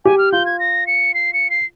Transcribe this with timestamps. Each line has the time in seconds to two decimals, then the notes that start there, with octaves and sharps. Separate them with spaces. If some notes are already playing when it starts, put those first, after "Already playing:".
0.05 G4 G#5
0.18 F6
0.32 F4 G6
0.46 G#6
0.59 A#6
0.87 C#7
1.14 C7
1.33 C#7
1.50 C7